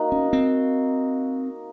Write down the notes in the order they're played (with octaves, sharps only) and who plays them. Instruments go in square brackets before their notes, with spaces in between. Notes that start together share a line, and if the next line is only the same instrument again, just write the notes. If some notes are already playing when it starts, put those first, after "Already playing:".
Already playing: [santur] A#3 D#4 F#4 A#4
[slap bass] C#4
C4